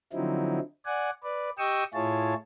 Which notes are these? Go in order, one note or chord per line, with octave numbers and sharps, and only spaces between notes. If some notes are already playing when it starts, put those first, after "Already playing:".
D3 F3 F#3 C4 D#4 E4
D5 F#5 G#5
B4 D5
G4 D#5 G5 C#6 D#6 E6
A2 E4 F4 G#4 C#5 A5